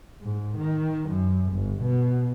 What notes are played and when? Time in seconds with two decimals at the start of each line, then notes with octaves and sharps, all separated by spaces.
0.22 G#2
0.58 D#3
1.10 F#2
1.53 G1
1.82 B2